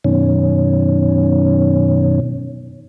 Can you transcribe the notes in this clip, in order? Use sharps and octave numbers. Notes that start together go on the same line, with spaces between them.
F#2 B2 D#3 C#4